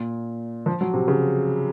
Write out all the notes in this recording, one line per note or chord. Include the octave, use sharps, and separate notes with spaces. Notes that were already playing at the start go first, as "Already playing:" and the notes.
Already playing: A#2
F3
F#3
C3
C#3